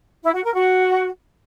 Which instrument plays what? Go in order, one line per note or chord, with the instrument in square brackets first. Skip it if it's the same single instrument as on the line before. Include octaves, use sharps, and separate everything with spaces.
[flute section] E4
F#4
A#4
F#4